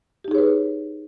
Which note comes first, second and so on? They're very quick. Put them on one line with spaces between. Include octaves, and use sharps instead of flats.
G4 D#4 G#4 C#5 B4